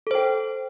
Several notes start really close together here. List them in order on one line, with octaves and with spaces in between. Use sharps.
A4 C5 G5